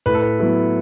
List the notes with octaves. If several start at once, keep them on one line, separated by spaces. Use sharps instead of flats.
A2 B4
A4
B4
F#3 B3 E4